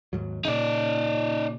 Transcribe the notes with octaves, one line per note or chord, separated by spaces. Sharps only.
D#2 G#2 F#3
A#2 C#3 D#4 D5